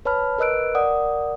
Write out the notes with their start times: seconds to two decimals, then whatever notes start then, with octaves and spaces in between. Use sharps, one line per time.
0.05 B4 C#5 A5 B5 F6
0.38 A#4 B4 D#5 E6 F#6 D7
0.75 A#4 D5 F#5 D#6